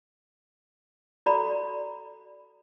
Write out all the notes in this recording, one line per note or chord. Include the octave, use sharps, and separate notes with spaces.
F#4 A4 D5 A#5 B5